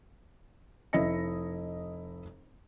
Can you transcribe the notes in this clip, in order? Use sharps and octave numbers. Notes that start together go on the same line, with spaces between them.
F1 E4 D#5 A#6 C#7